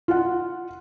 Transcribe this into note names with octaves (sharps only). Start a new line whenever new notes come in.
F4 F#5